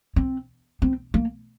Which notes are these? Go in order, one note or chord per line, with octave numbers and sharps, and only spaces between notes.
C4
C4
A#3